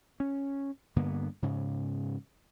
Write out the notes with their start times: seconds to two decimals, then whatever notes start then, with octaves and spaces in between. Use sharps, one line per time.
0.20 C#4
0.96 G2 D3 A#3 B3
1.42 G#2 C#3